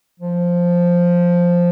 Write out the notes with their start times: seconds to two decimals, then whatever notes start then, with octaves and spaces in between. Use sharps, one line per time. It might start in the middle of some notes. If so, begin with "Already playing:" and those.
0.20 F3